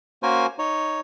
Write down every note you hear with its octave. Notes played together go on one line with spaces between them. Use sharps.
A#3 C#4 F#4 A#4 C5 G#5
D#4 C#5